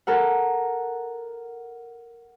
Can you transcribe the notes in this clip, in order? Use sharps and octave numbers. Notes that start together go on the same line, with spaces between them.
A4 A#4 F#5